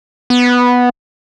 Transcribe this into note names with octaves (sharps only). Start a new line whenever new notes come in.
B3